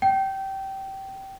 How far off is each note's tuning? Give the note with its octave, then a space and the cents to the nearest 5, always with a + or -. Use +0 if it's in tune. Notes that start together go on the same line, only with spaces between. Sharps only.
G5 -20